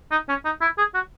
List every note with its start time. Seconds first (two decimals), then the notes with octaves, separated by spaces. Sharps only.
0.11 D#4
0.29 C#4
0.45 D#4
0.61 E4
0.78 G#4
0.94 F#4